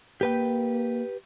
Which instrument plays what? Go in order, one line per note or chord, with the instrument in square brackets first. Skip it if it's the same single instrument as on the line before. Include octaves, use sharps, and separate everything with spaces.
[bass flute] A#3 [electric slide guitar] G4 B4 G5